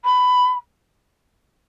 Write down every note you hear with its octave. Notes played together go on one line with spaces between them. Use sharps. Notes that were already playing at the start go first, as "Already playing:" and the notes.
B5